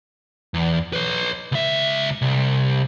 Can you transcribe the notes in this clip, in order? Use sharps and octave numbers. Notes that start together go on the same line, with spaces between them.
E2
B4 C#5
C#2 E5
C2